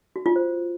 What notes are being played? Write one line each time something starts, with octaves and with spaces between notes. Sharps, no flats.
F#4
F4
C5